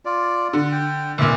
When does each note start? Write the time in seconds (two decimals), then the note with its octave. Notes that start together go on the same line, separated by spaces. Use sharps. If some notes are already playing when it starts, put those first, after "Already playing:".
0.05 F4 D5
0.53 D3 F#5
0.72 G5
1.18 F1 A#2 D5 E5